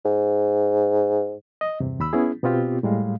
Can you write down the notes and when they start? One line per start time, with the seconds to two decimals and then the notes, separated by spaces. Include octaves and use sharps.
0.05 G#2
1.61 D#5
1.80 E2 G2 C3
2.00 D#2 B5 E6
2.13 B3 C#4 E4 G#4
2.43 B2 B3 C4 F4 G4
2.83 A2 G3 G#3 F5